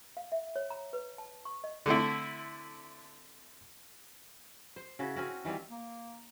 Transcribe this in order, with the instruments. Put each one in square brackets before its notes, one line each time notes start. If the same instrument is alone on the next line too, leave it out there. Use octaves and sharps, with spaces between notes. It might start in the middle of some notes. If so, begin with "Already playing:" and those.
[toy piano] F5
E5
C#5
A#5
B4
A5
C#6
D#5
[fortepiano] D3 A3 C4 E4
[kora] C5
C#3 E4 F#4
C4 C#4 F#4 A#4
D#3 E3 G3 C4
[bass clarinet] A#3